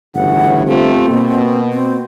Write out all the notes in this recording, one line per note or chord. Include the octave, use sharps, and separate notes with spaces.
G1 A2 C#3 E3 F#5
C3 A3 C4 F4
B2 A#3
C4